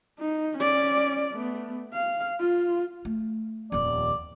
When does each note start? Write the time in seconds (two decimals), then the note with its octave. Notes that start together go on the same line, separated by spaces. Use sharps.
0.19 D#4
0.58 C#4 D5
1.34 A3 B3
1.94 F5
2.40 F4
3.05 A3
3.72 D#1 F2 D5